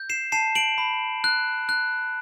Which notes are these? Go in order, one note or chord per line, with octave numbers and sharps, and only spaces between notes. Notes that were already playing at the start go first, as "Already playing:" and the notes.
Already playing: G6
C7 E7
A5 C7 E7
D7 F#7
B5
F#6
F#6